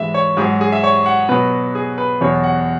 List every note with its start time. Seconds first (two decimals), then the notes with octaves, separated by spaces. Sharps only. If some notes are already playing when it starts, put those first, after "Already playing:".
Already playing: G#2 E3 G#3 E5
0.14 C#5
0.37 G#2 F#3 G#4
0.61 G#4
0.72 E5
0.83 C#5
1.06 F#5
1.29 B2 F#3 B4
1.75 G#4
1.98 B4
2.21 E2 B2 F#3 C#5
2.44 F#5